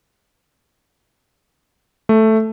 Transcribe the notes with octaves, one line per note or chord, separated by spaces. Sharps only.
A3